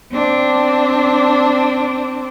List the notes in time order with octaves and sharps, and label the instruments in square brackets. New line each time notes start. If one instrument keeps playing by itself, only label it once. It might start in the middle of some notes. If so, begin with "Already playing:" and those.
[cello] C4 D4